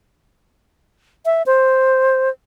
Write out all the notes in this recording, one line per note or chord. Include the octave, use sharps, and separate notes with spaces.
E5
C5